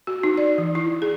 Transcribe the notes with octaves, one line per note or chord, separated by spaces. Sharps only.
F#4
D#4
D5
E3
E4
G#4